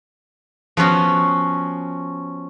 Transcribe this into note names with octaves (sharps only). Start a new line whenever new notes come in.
F3 B3 C#4 F#4